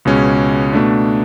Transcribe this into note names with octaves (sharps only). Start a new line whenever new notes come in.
C#2 B2 G#3 C#4
B2 A3 D4